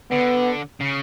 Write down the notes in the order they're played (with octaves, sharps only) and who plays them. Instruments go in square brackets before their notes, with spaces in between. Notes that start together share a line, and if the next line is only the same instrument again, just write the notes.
[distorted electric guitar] D3 [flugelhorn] B3
[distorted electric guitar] C#3